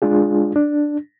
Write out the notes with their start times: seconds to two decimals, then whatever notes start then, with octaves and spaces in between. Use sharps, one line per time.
0.02 G#3 D4 F4 G#4
0.56 D4